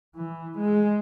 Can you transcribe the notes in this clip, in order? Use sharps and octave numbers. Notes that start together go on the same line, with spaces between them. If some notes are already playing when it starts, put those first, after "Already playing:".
E3
G#3